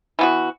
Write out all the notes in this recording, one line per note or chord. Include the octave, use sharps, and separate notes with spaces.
E3 B3 F#4